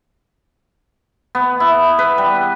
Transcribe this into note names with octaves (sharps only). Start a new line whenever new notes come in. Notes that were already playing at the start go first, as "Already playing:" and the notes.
B3
E4
B4
G3